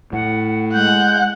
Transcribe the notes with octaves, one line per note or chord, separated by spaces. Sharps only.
A2 F#5
G#3 F#5 G6